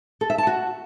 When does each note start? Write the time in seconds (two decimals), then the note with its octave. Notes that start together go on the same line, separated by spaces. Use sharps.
0.21 A4
0.30 E5
0.38 A5
0.47 F#4